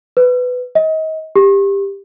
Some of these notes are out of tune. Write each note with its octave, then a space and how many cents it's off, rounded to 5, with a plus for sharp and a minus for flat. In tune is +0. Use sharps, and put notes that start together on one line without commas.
B4 +15
D#5 +30
G4 +15